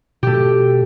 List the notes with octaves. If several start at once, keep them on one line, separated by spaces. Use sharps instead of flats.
B2 A3 G4